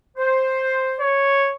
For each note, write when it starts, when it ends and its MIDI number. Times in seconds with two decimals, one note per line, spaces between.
0.17 1.02 72
1.00 1.54 73